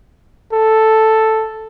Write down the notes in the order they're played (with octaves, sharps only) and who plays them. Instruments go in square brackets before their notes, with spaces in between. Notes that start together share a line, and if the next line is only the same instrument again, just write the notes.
[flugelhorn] A4